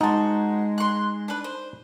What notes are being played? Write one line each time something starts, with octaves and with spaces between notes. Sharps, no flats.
G#3 D#4 F#4 C5 A5
C6 F#6
D4 B4
C5